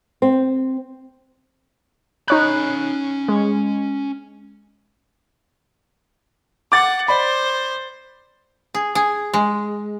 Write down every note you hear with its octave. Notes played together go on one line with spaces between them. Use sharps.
C4
C#4 D#4 C#5 B5 F#6
G#3
F#5 D6 A6
C5 D5 B5
G#4
G#4
G#3